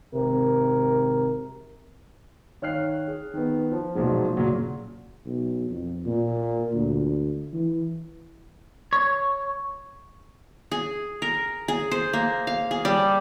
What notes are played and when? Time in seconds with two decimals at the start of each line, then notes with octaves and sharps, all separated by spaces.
0.13 G#1 C3 A#4
2.62 D#3 C#5 F5 F6 F#6 C7
3.08 G#4
3.34 D#3 B3
3.72 F3
3.95 B1 A#2 F3 F#3 G#3
4.37 A#2 C#3 F#3
5.26 B1
5.70 F2
6.06 A#2
6.74 D2
7.53 E3
8.93 C#5
10.72 G#4
11.22 A#4
11.68 G#4
11.91 C5
12.13 A#3
12.47 F5
12.71 G#4
12.85 G3